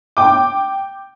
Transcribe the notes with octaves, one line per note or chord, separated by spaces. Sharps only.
G5 D6